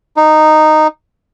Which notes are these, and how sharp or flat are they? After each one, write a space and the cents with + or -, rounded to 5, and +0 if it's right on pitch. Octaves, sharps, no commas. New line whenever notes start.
D#4 -10